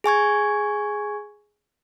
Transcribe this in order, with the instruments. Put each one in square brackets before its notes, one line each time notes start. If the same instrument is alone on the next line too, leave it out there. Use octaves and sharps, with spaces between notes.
[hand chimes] G#4 G#5 C#6 G#6